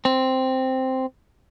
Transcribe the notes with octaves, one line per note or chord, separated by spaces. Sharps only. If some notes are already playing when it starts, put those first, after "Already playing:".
C4